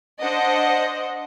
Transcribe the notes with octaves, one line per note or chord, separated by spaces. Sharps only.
D4 C5 D#5 F#5